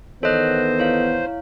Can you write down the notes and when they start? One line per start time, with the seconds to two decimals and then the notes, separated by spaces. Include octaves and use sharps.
0.23 D#3 E3 B3 A4 C5 C#5 D#5 F#6
0.79 E4 C#5 F5